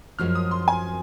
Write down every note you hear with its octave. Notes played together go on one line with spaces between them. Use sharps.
F#2 F3 G#3 C#4 F#4 F6
D#6
C6
G#5